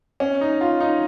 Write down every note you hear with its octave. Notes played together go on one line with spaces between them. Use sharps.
C#4
D#4
F4
D#4